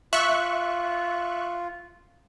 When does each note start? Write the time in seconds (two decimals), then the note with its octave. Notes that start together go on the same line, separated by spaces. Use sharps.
0.13 F4 E5 C#6 F#6